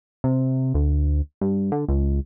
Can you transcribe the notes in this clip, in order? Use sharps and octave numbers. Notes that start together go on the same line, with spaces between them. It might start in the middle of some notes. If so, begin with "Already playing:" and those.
C3
D2
G2
D3
C#2